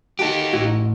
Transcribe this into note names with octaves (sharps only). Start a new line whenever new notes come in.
D#4 F#4 G4 A4
A1 A2 E4 F#4